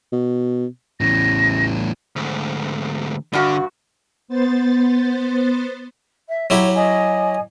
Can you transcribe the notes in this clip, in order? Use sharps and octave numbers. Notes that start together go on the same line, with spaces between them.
B2
A1 E2 A2 A#6
D2 G#2
G2 D3 F#4
B3 C5 A6
E5
F#3 E4 G4 C#5
D#5 G#5